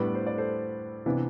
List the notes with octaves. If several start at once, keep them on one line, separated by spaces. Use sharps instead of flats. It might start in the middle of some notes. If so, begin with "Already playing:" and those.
Already playing: A2 G3 B3 D4 B4 D5
C5
D5
A4 C5
C3 E3 B3 D4